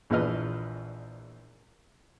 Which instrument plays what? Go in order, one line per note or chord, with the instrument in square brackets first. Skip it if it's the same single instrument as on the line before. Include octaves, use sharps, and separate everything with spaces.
[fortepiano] A#1 E2 F3 B4 D#5 F6